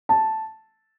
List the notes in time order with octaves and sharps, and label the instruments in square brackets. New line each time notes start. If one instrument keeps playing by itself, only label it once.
[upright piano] A5